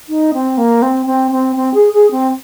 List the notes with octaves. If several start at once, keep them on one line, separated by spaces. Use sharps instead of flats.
D#4
C4
A#3
C4
C4
C4
C4
G#4
G#4
C4